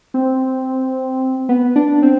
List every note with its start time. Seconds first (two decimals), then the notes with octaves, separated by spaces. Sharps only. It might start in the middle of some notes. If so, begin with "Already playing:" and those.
0.14 C4
1.49 B3
1.76 D4
2.02 C4